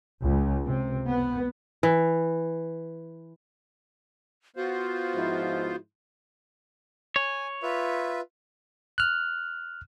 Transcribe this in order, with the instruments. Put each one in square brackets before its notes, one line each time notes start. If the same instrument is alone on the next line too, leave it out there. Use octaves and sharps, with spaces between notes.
[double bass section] C#2
C3
B3
[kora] E3
[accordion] B3 F4 C5 [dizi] F#4
[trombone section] G#2 F3 E4
[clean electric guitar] C#5 [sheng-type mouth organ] G#5
[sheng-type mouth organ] F4 B4 E5
[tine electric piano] F6 F#6